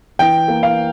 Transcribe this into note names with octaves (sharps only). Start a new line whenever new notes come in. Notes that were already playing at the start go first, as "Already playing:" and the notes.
E3 G5
A#3
F5